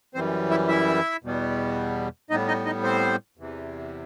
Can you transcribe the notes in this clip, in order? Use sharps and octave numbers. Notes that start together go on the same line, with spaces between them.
F#2 E3 G3 C4 C5
E4 E5
E4 E5
E2 B2 G3 B3
A2 G3 B3 D#4 D#5
D#4 D#5
D#4 D#5
C4 C5
E2 C3 E3